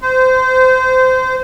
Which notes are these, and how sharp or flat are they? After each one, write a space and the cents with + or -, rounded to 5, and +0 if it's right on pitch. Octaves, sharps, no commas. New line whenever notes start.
C5 -25